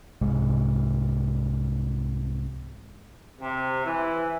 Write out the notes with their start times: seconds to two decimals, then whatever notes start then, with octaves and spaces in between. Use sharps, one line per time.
0.21 C2 G#2 C3 G#3
3.41 C3
3.85 E3